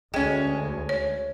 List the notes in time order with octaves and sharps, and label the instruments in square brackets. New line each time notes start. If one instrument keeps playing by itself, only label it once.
[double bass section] D2 [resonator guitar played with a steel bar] G#3 C#4 [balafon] G5
[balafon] C#5